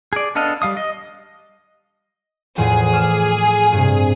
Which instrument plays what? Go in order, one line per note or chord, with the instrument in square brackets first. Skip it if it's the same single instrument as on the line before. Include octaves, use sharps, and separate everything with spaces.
[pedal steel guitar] G#4 D5
B3 D4 A4 D#5 F5
G3 F5 D#6
D#5
[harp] E2 A2 F3 [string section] G#4
[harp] D6 F6 E7
G2 C3